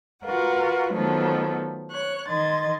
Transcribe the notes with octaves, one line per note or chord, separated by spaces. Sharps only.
F4 F#4 A#4 B4 F#5
D#3 F3 F#3 A3 B3 A4
C#5 F#6
D#3 D#5 C6 G#6 A6